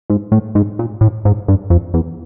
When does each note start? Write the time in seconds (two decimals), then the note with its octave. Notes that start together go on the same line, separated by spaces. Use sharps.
0.10 G#2
0.32 A2
0.55 G#2
0.79 A#2
1.01 A2
1.25 G#2
1.48 G2
1.70 F2
1.94 E2